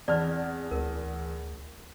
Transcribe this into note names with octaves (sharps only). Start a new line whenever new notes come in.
E2 C4 D5 A5 F6
D2 A#4